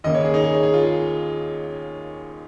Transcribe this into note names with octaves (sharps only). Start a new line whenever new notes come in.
D#2 C#3 A#3 D#5
C#5
G#4
D#4
G#4
C#5
G#4
F4
G#4